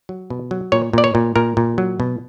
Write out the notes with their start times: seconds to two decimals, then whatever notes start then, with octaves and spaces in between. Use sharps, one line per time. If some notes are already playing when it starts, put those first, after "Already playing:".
0.09 F#3
0.30 B2
0.51 F#3
0.72 A#2 C#5
0.93 A#2 D5
1.04 C#5
1.15 A#2
1.36 A#2 A#4
1.57 A#2
1.78 F#3
2.00 B2